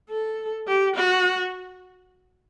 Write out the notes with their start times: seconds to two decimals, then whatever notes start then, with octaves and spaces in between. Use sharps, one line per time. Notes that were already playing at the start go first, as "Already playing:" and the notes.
0.10 A4
0.68 G4
0.96 F#4